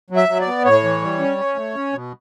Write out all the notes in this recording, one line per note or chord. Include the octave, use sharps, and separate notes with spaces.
F#3
E5
F#3
D5
B3
A2 C#5
E3
G3
C#4
C#4
A3
C#4
B2